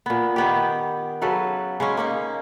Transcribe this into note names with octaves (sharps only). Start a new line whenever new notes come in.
A#2 B3
D#3 B3 G4
C#3 F#3 A4 B4
C#3 G#3 C#4
A#3 C#4 D#4